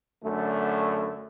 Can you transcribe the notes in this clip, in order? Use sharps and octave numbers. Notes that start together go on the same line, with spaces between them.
F#2 D3 A3